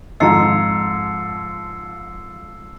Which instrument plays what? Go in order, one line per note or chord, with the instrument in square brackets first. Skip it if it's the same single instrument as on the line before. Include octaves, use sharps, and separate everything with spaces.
[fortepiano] F2 G#2 F3 [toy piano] D#5 A#5 [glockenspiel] E6 C7 C#7